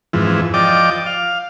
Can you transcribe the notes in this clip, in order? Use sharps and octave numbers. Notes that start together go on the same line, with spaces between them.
F2 G#2 E3
F3 D5 D#5 G5 D6
F5